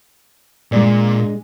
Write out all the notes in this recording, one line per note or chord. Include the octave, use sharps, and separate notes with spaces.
A#2 G#3 D4 D5